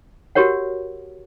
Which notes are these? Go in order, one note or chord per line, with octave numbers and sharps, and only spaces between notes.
F#4 G4 A#4 C#5 F#5